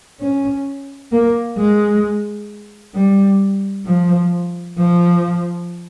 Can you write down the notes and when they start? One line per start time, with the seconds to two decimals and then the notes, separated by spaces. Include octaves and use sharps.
0.21 C#4
1.12 A#3
1.58 G#3
2.95 G3
3.86 F3
4.78 F3